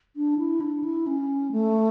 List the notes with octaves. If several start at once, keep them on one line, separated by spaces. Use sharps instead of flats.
D4
E4
D4
E4
C#4
A3